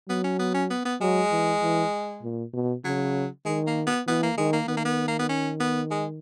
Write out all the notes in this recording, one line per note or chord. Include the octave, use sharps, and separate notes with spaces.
F#3 B3
C#4
B3
C#4
B3
B3
F#3 G#3
E3
E3
A#2
B2
C#3 F#3
D#3 G#3
A#3
B3
E3 B3
A#3
D#3 G#3
A#3
D#3 B3
A#3
B3
A#3
B3
C#4
B3
G#3